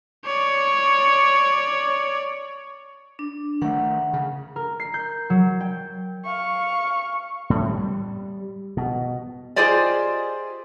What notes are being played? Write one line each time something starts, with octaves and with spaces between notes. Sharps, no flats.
C#5 D5
D4
D#3 A3 F#5
C#3
A#4
C7
G6
F#3
G5
F5 C#6
A2
G3
B2
F4 G4 G#4 C5 D5 D#5